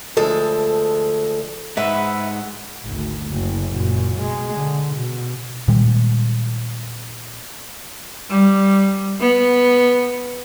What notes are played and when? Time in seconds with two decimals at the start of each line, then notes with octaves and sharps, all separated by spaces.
0.17 D2 F3 G#3 A4 E5
1.77 G#2 B4 E5 F#5
2.83 G#1 D2
3.28 F#1
3.70 F#2 A#2
4.16 B2 G#3
4.56 D3
4.95 B2
5.68 A#2 D#3 G3 G#3
8.30 G3
9.20 B3